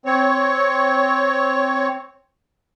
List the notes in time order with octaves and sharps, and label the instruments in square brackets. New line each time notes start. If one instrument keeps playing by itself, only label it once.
[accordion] C4 C#5